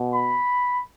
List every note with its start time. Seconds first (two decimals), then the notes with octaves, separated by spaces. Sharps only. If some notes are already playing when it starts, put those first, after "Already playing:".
Already playing: B2
0.13 B5